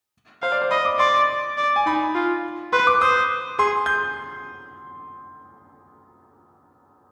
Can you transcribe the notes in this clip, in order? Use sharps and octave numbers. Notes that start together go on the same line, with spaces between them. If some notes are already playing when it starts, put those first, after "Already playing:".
C5 F5
D5
C5
D#5 B5
D6
D5 C6
D5
G#5
D#4 B5
F4
B4 C6
D6
C5 D#6
G#4 C6
G6